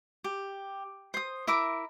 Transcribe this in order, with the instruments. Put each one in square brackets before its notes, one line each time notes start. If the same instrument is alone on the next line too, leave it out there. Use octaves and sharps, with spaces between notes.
[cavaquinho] G4
C5 D#6
E4 A#4 E5 D6